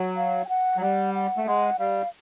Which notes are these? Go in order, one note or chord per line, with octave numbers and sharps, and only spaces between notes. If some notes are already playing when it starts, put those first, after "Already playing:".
Already playing: F#3
F5
G5
F#5
F#3
G3 F#5
F#5
A3
G#3 F#5
G3 F5